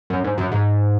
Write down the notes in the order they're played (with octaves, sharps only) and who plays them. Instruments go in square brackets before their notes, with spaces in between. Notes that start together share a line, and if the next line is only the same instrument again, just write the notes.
[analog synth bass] F#2
G#2
F#2
G#2